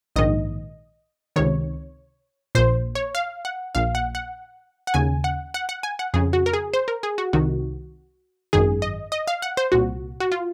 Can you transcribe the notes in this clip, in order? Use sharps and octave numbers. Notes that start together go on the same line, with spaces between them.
A#1 G#2 D#3 D#5
C#2 C3 D#3 C#5
A#1 A#2 C5
C#5
F5
F#5
A#1 A#2 F5
F#5
F#5
F#5
D#2 C#3 G#5
F#5
F#5
F#5
G#5
F#5
F2 C#3 G#4
F#4
A#4
G#4
C5
A#4
G#4
F#4
C2 C3 D#3 F#4
G#1 F#2 D#3 G#4
D#5
D#5
F5
F#5
C5
C2 A#2 F#4
F#4
F4